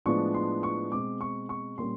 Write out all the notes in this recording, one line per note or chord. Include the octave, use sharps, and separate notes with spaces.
A2 F3 G#3 B3 D4 C#6
C6
C#6
B2 G#3 C4 D6
C#6
C#6
A#2 G3 A#3 C#4 C6